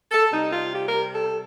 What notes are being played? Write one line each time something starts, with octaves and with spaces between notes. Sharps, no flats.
A4
C3 G3 D#4
F4
G4
A#4
A4